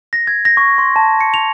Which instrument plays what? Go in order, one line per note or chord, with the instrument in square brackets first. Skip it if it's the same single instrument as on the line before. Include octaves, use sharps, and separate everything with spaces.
[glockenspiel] A#6
G#6
A#6
C#6
C6
A5
C#7
F7